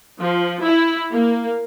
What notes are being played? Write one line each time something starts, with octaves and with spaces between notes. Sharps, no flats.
F3
E4
A#3